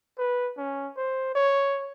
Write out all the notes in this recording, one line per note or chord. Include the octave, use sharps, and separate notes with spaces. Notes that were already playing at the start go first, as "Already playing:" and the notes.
B4
C#4
C5
C#5